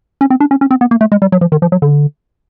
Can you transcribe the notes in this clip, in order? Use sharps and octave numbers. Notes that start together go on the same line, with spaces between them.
C#4
C4
D4
C#4
C#4
C4
B3
A#3
A3
G#3
G3
F#3
F3
D#3
F3
F#3
D3